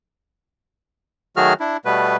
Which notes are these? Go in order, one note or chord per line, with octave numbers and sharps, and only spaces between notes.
D#3 F#3 A3 F#4 G#4 F6
D4 E4
B2 G3 A3 B3 B4